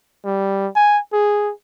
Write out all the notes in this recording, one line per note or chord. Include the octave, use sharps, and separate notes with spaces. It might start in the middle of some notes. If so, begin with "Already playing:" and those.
G3
G#5
G#4